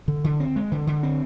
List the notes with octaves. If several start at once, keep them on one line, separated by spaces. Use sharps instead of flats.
D3
D3
C4
G#3
D3
D3
C4